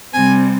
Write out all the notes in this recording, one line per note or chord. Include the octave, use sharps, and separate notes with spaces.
C3 G3 C4 G#5